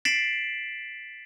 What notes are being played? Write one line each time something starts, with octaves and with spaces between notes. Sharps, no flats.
A6 B6 C7 D7 E7 F#7